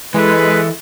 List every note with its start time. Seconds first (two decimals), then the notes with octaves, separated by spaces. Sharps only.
0.14 E3 G#3 A4 B4